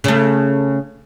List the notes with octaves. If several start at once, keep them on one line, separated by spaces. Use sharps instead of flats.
C#3 A3